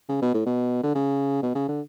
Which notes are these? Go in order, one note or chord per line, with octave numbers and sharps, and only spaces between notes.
C#3
B2
A2
B2
D3
C#3
B2
C#3
D3